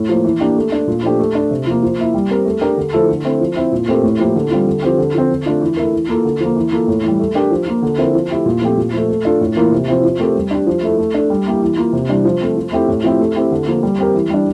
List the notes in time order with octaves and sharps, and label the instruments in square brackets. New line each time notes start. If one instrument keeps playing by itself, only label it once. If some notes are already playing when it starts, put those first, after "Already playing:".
Already playing: [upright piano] A2
F3 A#3
E3
A#3 D4 G4
A3
D4 A4
A#2
F3 A3 D4 G4
A3
D4 A4
C3
F3 A#3
F3
A#3 E4
G3
C4 G4 A#4
A3
D4 G4 A#4
D3
F3 A3 E4 A4
D3
A3 C4 E4
F3
C4 E4
A#2
A3 C4 G4 A#4
A2
F3 A#3 E4 G4
D3
G3 C4 F4
D3
F3 C4 G4
D3
F3 C4
D3
A3 D4 F4
E3
A3 E4 A#4
E3
A#3 F4 A4
D3
F3 A#3
E3
A#3 F4 A4
A2
E3 G3
A3
D4 G4 A#4
F3
A#3 F4
D3
F3 C4 E4 A#4
F3
A3 E4 G4
A#2
F3 A3 C4 G4
A#2
F3 A3
A3
D4 F4 A4
A2
E3 A#3 F4 A#4
C3
F3 C4 E4
F3
A3 C4 G4 A#4
G3
D4 G4
F3
A3 E4 A4
A3
D4 A4
G3
A#3 E4 G4
E3
A#3 F4
C3
E3 G3 D4 G4
F3
A3 C4
F3
A3 C4 E4 G4
A2
F3 C4 E4 G4
A3
C4 E4 G4
D3
F3 A#3
G3
C4 G4 A#4
E3
G3 D4